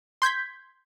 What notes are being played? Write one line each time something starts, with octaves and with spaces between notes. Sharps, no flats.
C6 G6 G#6 B6